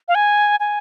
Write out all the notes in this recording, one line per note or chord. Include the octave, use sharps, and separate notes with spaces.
F5
G#5
G#5